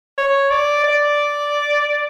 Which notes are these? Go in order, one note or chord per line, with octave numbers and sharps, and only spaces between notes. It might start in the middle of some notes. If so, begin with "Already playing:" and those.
C#5
D5
D5